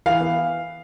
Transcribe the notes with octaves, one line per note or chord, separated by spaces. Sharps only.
E3 F5
B3